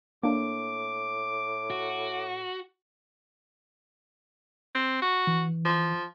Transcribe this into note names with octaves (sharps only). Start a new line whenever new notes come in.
A2 A#3 D4 D6
F#4
C4
F#4
E3
F3